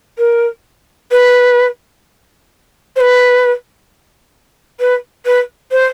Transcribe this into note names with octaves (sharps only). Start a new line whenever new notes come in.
A#4
B4
C5
B4
B4
B4
C5